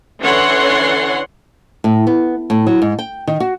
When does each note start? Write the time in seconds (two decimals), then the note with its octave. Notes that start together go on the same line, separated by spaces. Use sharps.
0.21 D3 E3 C#4 C#5 F#5 C6
1.84 A2
2.07 B3
2.50 A2
2.67 F#3
2.82 G#2
2.99 G5
3.27 D#3
3.40 F#4